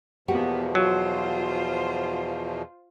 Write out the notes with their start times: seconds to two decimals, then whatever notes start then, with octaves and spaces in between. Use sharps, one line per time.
0.28 E2 B2 F3 A#3 B3 F#4 G4 F#5
0.75 F#3 F4 C5